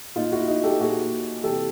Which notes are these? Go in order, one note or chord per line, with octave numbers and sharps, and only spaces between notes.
A#2 D#4 F4
E4 F#4
D#4 F4
G4 A4
A#2 F#4 G#4
C3 E3 G4 A4